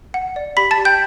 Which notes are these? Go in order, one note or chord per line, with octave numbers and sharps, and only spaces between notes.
F#5
D5
G4 B5 B6
A5 A6
G4
G5 G6